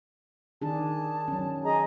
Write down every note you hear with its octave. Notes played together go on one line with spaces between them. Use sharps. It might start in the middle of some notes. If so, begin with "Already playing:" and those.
D#3 D4 G#4 A5
F#3 C#4
G#4 D#5 A#5